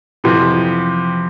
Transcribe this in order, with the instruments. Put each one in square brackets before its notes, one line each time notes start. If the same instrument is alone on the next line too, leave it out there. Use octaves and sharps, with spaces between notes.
[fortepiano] F2 C3 E3